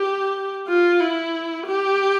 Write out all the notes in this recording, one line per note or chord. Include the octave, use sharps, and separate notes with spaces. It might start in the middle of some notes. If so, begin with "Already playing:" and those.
Already playing: G4
F4
E4
G4